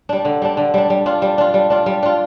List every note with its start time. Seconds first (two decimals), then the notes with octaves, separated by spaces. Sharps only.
0.09 G3 D4
0.25 D3
0.42 G3 D4
0.57 D3
0.74 G3 D4
0.90 G3
1.06 D4 F4
1.22 G3
1.38 D4 F4
1.54 G3
1.70 D4 F4
1.86 G3
2.03 D4 F4